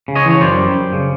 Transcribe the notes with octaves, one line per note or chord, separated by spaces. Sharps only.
C#3
C#5 D#5
E3
C#5
F#2 C5 D5
G3
F#2
C#3